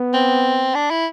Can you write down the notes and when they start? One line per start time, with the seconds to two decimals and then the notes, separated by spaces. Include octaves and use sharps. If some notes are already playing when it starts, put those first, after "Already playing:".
Already playing: B3
0.13 C4
0.75 D4
0.90 E4